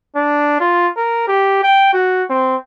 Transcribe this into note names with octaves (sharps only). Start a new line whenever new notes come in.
D4
F4
A#4
G4
G5
F#4
C4